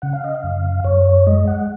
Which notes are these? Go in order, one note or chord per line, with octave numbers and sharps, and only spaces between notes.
C#3 F#5
F5
D#5
F5
F#2
F#2 C#5
C#5
G#3 D#5
F#5